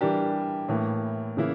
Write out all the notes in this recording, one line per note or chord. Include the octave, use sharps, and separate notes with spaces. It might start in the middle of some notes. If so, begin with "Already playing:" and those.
E3 G3 D4 G4 A#4
A2 E3 A#3
C#3 E3 A#3 E4